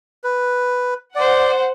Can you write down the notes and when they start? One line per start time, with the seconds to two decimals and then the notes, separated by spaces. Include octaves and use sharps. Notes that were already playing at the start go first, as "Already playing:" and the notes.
0.24 B4
1.15 C5 D5 F#5